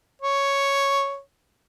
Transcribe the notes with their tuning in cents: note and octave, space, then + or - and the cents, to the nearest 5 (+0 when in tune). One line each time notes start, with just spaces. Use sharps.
C#5 +0